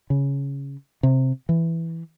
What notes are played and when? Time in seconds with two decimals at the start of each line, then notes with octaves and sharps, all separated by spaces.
0.10 C#3
1.03 C3
1.49 E3